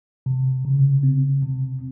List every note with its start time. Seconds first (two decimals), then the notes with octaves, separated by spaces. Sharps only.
0.26 C3
0.65 C#3
1.03 C4
1.43 C3